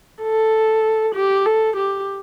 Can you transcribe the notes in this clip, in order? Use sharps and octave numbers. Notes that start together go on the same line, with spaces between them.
A4
G4
A4
G4